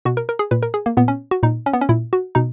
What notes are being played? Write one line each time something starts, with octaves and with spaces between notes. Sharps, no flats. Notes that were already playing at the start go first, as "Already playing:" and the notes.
B2 F#4
A#4
A#4
G#4
A#2 B4
A#4
G#4
A#3
A#2 B3
C#4
F#4
A#2 D#4
C#4
B3
C#4
A#2 E4
F#4
B2 D#4